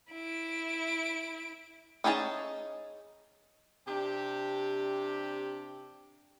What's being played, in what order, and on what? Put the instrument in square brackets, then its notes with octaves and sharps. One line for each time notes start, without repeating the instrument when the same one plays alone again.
[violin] E4 D7
[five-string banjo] C#4 D#4 G#4 D5 A5
[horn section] C3 D4 G4